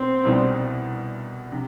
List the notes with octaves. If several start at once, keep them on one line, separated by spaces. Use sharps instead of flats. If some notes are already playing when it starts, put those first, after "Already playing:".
Already playing: B2 C4
C2 B2 G3
C3